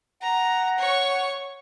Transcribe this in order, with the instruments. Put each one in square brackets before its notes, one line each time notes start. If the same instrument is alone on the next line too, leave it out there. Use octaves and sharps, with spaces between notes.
[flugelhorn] F#5 [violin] A#5
[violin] C#5 C#6